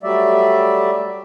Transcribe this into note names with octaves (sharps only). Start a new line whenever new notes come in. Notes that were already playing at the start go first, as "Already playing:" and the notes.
F#3 G3 A3 D5 E5